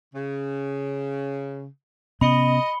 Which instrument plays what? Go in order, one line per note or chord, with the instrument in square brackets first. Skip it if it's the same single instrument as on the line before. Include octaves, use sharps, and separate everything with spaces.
[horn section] C#3
[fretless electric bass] C3 B3 C#4 [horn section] D#5 [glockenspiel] B5 C#7 G7